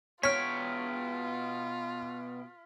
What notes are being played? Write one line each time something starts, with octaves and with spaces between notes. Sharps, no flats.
B2 F4 C#5 G5 F6 B6